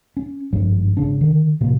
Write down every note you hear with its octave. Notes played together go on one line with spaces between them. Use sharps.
C#4
G#1 G2 F3
G#1 C#3 C#4 D4
D3 D#3
A2 C3 F3 A#3